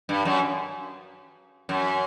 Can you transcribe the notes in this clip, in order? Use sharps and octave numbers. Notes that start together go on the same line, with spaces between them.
G2
F#2
F#2